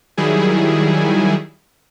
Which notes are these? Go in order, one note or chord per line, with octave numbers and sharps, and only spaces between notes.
D#3 F#3 G3 E4 G#4